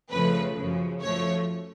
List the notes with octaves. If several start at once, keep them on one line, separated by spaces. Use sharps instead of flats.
F2 C#3 F3 A3 B4
F#2 C#3 F3
F#2 F3 A3 C#5